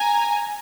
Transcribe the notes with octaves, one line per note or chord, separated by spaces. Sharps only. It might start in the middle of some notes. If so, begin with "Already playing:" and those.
Already playing: G#5 A#5